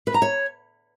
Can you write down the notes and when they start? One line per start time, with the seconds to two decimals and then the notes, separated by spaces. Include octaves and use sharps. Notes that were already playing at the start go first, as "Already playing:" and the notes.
0.07 B4
0.14 A#5
0.22 C#5